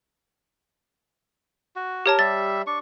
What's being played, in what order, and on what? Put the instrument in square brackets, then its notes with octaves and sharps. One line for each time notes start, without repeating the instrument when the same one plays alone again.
[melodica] F#4
[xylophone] G4 C#5 A5 [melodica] A#4
[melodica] G3 E5 [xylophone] A6
[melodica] D4 C#6